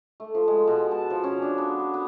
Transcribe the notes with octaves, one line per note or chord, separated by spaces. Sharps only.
A3
F3
G#3
B2
A5
F3
C#4
D4
B3
F#4
B3